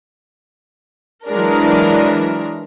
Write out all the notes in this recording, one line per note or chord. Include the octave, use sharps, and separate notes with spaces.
E3 F#3 G#3 D4 A#4